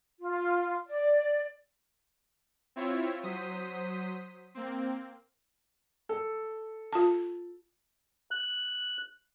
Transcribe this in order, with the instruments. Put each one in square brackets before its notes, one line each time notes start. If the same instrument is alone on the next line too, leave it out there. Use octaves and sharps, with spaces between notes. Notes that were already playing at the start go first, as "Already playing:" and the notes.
[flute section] F4
D5
[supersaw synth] C4 E4 F4 C#5 E5
F#3 C5 D#6 B6
A#3 C4
[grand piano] A4
[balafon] F4 A5
[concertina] F#6